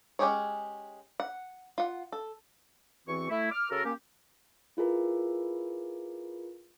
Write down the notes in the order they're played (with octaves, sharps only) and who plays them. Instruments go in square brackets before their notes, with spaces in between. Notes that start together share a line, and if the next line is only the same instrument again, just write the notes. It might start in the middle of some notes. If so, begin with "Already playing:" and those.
[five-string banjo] G#3 C#4 G4 G#4 C#5
F#5
F4 F#5
A4
[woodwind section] E2 E3 C4 F#4 C#6
A3 E4
D6 F6
C#3 F#4 A4 A#4
A#3 C#4 G4
[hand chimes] E4 F4 G#4 A#4 B4